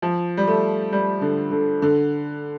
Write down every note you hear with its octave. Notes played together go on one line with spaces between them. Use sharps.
F3
G3
A3
G3
D3
D3
D3